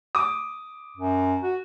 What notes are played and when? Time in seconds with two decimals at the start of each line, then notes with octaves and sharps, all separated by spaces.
0.15 D6 D#6
0.97 F#2
1.42 F#4